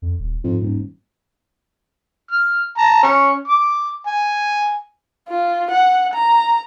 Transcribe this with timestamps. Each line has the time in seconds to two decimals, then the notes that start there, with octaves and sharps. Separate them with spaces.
0.02 F2
0.19 D#1
0.44 F2 G#2
0.61 D#1 G#2
2.31 F6
2.78 A5 A#5
3.03 C#4
3.48 D6
4.07 G#5
5.29 F4
5.71 F#5
6.14 A#5